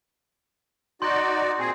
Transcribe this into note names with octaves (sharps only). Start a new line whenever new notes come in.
D#4 F#4 D5 C6 G6
A#2 C4 G#4